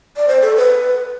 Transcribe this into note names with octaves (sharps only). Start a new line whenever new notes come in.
D5
C5
A4
B4